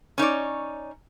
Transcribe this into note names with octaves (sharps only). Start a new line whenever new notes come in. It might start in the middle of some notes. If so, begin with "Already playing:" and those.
C#4 D#4 C#5 D5